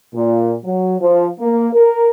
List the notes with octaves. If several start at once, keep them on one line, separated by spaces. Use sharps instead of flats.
A#2
F#3
F3
A#3
A#4